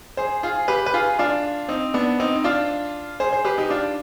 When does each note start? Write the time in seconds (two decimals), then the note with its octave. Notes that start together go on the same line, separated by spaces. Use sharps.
0.17 G#4 C5
0.43 F4 G#4
0.68 G4 B4
0.86 B4
0.94 F4 G#4
1.19 D4 F4
1.68 C4 D#4
1.94 B3 D4
2.20 C4 D#4
2.36 D#4
2.44 D4 F4
3.20 G#4 C5
3.32 G#4 C5
3.45 G4 B4
3.58 D#4 G4
3.70 D4 F4